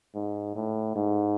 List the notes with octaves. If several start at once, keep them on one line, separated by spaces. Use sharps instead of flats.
G#2
A2
G#2